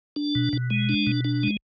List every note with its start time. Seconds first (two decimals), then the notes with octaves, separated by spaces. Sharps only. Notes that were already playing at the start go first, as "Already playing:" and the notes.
0.16 D4
0.35 B2
0.53 B2
0.70 G#3
0.89 D4
1.07 B2
1.25 D4
1.43 G#3